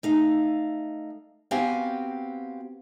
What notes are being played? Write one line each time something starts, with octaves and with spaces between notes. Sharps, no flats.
A3 D#4 F5
B3 C4 F#4 G4 F5 G#5